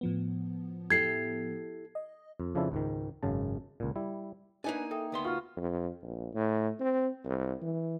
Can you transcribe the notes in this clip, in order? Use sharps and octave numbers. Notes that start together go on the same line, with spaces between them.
A2 F3 B3
E4 G4 A4 G#6 C7
D#5
F2
F2 C#3 F3 D4 E4 A4
C#2 G#2 D#3
G#1 F#2 C#3 A5
C#2 A#2
G3 E4
A#3 D4 D#4 B4 G#5
A4 E5 G5 D#6
D2 B3 C6
F4 F#4 C#6 F6
F2
A#1
A2
C4
C2
E3